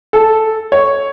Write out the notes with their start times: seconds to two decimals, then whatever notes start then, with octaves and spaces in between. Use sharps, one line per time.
0.13 A4
0.72 C#5